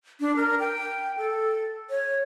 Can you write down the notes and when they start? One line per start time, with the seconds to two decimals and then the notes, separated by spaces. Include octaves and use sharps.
0.20 D4
0.36 A#4
0.60 G5
1.18 A4
1.90 C#5